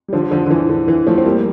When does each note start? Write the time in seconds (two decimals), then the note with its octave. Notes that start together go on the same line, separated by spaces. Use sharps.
0.08 G3
0.13 D3 F3
0.31 D3 F3
0.46 D3
0.51 E3
0.69 D3
0.88 E3
1.07 F3 A3
1.18 C4
1.25 G3 A#3